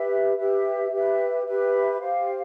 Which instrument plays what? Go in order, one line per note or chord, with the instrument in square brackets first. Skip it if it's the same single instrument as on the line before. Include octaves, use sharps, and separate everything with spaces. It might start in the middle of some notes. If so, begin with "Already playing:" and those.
Already playing: [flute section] G4 B4 E5
G4 B4 E5
G4 B4 E5
G4 B4 E5
G4 C5 F5